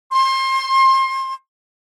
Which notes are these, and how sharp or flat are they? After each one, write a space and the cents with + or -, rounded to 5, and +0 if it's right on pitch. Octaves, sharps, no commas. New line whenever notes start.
C6 +30